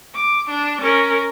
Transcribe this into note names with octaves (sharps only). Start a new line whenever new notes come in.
D6
D4
C#4 A#4